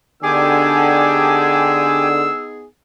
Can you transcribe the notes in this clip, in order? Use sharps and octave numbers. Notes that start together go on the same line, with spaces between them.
D3 B3 D#4 G4 G#4 G#5 D6 E6